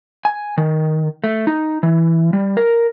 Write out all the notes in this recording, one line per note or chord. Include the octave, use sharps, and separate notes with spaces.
G#5
D#3
A3
D#4
E3
G3
A#4